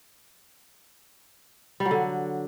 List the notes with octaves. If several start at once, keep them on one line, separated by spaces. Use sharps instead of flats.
G3
F#3
D3